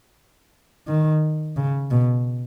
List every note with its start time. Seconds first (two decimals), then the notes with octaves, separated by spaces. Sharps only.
0.88 D#3
1.57 C#3
1.91 B2